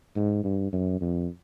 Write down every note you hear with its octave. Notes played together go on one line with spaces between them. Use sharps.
G#2
G2
F#2
F2